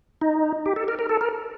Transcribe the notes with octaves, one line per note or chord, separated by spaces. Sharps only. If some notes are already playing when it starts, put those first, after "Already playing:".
D#4
G4
A4
A#4
A#4
A4
A#4